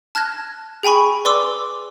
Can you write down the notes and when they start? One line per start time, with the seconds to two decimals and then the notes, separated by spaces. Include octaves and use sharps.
0.15 A5 F6 F#6 G#6 A#6
0.83 G#4 G5 G#5 B5 C#6
1.25 B4 D5 C6 D6 E6